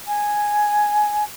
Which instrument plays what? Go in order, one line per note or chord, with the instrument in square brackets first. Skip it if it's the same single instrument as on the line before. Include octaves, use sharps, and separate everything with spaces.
[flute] G#5